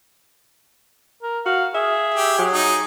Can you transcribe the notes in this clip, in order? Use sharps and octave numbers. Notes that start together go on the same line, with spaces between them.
A#4
F#4 F5
G#4 E5
G4
F#3 G#4
D#4